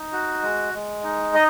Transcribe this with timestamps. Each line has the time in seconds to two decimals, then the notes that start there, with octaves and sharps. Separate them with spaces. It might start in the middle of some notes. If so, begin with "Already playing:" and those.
Already playing: D#4
0.13 F#4
0.42 G#3
0.74 G#3
1.04 D#4
1.35 D#5